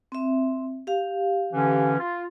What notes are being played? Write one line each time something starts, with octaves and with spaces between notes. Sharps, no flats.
C4 E5
G4 F5
D3 E3 C#4
F4